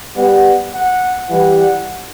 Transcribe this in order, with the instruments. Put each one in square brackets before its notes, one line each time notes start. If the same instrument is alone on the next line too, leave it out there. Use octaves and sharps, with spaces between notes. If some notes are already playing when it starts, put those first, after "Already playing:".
[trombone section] G3 B3 [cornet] F#5
[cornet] F#5
[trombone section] E3 G3 [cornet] F#5
[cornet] F#5